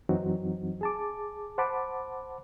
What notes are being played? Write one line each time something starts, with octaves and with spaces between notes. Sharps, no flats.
F#2 E3 F#3 C4 D#4 F#4
G#4 A5 D6
C5 F#5 A5 B5 D6